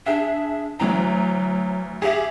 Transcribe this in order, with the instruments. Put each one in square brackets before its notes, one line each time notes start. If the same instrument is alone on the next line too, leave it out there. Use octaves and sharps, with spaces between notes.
[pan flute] D4 [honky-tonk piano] G#4 E5
[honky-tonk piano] D2 E3 A#5 [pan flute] F#3
[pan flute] G4 [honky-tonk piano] G#4 E5